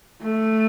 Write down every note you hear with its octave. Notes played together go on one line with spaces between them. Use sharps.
A3